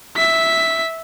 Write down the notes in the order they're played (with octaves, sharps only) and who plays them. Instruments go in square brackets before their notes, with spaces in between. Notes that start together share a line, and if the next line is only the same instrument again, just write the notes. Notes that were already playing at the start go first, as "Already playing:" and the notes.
[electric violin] E5 B6